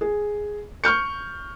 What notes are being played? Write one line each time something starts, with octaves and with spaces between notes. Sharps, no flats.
G#4
C#6 F6 G6 C#7